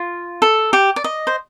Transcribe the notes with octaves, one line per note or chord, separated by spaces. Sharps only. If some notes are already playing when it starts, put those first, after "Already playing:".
Already playing: F4
A4
G4
D5
D#5
C5